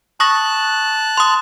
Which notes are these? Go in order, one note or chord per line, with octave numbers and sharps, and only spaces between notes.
A5 C#6 D#6 F#6 A#6
C6 D#6